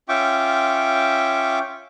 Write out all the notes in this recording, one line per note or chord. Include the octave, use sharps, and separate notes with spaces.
C#4 F4 E5 G5 C#6 D6